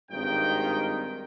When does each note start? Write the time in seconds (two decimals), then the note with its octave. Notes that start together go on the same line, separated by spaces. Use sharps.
0.11 G#1 G2 A#2 D#3 D#5 G5